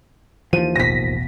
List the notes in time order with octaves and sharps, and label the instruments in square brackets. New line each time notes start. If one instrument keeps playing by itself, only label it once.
[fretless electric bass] D#2 F3 [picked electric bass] E3 [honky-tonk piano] D#7
[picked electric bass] E1 A1 B2 [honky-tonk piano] A#6 B6